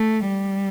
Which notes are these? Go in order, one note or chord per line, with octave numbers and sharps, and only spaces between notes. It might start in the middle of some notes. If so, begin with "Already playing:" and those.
Already playing: A3
G3